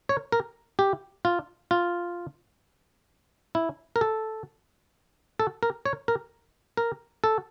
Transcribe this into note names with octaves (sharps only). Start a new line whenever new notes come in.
C#5
A#4
G4
F4
F4
E4
A#4
A4
A4
A#4
C#5
A#4
A#4
A4